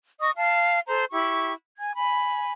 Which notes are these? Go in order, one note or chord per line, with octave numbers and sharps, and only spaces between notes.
D#5 C#6 D#6
F5 A5 F6
A4 C5 A#5
E4 G4 C#6
G#5 G#6
G#5 B5